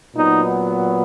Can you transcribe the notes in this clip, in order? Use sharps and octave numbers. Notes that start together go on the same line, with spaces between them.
A#2 F#3 B3 D#4